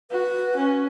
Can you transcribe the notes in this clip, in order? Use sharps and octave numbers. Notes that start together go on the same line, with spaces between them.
F#4 B4
C#4